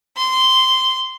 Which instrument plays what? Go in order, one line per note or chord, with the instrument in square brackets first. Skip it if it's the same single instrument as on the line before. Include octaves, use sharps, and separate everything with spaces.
[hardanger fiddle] C6